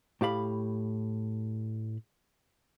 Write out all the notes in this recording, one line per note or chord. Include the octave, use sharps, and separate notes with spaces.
A2 G4 F5 B5